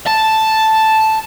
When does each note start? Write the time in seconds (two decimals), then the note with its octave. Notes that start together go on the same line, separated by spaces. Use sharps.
0.07 A5